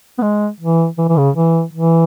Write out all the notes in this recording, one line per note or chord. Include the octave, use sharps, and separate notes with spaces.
B3
G#3
E3
E3
E3
C#3
E3
E3